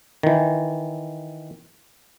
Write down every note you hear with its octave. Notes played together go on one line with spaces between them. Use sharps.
D#3 E3